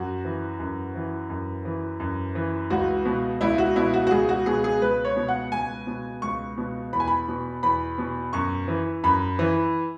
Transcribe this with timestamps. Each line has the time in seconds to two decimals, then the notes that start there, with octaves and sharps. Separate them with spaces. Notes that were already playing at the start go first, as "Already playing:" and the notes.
Already playing: F#2 F#4
0.25 E3
0.59 F#2
0.95 E3
1.30 F#2
1.65 E3
2.00 F#2
2.35 E3
2.70 C#2 F#4
3.05 B2
3.41 C#2 E4
3.58 F#4
3.76 B2 E4
3.94 F#4
4.07 F#4
4.11 C#2 G#4
4.29 F#4
4.46 B2 G#4
4.64 G#4
4.81 C#2 B4
5.04 C#5
5.17 B2
5.28 F#5
5.52 C#2 G#5
5.87 B2
6.22 C#2 C#6
6.58 B2
6.93 E2 B5
7.00 G#5
7.08 B5
7.28 B2
7.63 E2 B5
7.98 B2
8.33 F#2 C#6
8.68 E3
9.04 F#2 B5
9.39 E3